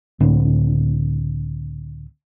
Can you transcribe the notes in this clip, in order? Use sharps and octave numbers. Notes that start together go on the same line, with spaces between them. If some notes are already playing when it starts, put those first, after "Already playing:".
C#2 A2 D3 C4